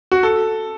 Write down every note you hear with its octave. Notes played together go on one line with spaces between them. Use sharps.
F#4
A4